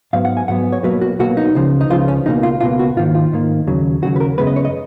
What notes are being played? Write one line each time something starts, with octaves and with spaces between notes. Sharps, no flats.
G#2 F#3 B3 F5
F#5
G#5
G#2 F#3 B3 F#5
C#5
B1 B2 F#3 A#3 B4
F#4
B1 B2 F#3 A#3 F#4
D#4
C#2 C#3 F3
D#4
C#2 C#3 F3 F4
C#4
C#2 B2 A#3 D#4
F4
C#2 B2 A#3 F4
F#4
G#2 D#3 A#3 F4
F4
G#2 D#3 A#3
D#2 C#3 F#3
D#2 C#3 F#3 F#4
B4
A#4
F#2 C#3 G#3 B3 B4
D#5
C#5
D#5